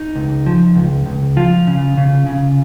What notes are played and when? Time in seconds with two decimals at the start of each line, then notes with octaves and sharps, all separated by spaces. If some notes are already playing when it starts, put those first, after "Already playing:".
Already playing: D#4
0.15 C#2
0.46 F3
0.75 C#2
1.06 C#2
1.37 F3 F4
1.67 C#3
1.97 C#3
2.27 C#3